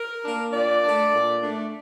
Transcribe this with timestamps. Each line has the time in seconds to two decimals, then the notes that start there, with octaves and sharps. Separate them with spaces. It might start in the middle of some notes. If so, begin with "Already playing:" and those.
Already playing: A#4
0.23 A#3 D4
0.53 A#2 D5
0.83 A3 D4
1.13 A#2
1.42 A3 D4